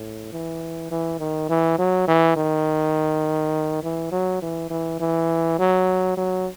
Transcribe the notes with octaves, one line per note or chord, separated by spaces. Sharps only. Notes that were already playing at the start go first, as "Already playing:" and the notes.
Already playing: A2
E3
E3
D#3
E3
F#3
E3
D#3
E3
F#3
E3
E3
E3
F#3
F#3